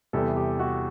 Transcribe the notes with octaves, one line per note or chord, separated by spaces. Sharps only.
E2 C3 G3 A4
G4
F#4